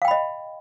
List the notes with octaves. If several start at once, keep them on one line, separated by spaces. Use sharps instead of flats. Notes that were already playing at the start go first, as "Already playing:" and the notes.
D#5 F5 G5 B5